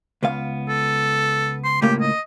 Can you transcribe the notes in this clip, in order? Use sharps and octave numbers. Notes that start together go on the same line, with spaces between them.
C#2 B3 F5
A4
C6
C#2 A2 A#3 G4
D#5